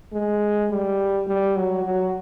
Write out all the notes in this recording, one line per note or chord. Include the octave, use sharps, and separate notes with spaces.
G#3
G3
G3
F#3
F#3